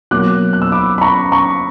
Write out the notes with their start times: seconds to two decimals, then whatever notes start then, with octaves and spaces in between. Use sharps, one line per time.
0.11 B2 F#3 A#3 D6 F#6
0.53 F#6
0.62 E6
0.72 B5 D6
0.98 B5
1.01 A#5 C#6
1.32 A#5 C#6